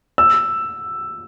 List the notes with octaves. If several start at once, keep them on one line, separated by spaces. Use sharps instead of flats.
E6